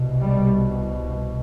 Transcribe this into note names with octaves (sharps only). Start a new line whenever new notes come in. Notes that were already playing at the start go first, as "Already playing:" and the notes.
Already playing: C2 B2
G3